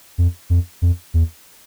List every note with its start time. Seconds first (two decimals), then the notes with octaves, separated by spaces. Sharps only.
0.18 F2
0.50 F2
0.82 F2
1.14 E2